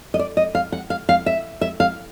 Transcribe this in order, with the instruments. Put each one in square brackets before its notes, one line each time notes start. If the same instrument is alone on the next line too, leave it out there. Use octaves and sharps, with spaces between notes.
[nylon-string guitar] D#5
D5
D#5
F5
F#5
F5
F5
E5
E5
F5